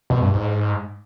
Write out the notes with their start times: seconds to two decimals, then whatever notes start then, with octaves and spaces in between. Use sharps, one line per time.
0.10 B2
0.22 G2
0.34 G#2